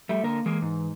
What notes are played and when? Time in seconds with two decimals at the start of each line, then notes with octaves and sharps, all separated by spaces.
0.09 G3 A3 E5
0.24 D3 A#3 A#4
0.46 E3 G#3 A#3
0.62 G#2